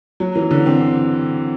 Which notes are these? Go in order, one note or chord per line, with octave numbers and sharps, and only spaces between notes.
F#3
E3
D3
C4